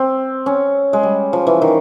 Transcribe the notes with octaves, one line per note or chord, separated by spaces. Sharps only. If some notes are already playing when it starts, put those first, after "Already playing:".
Already playing: C4
C#4
G#3
G3
F3
E3
D#3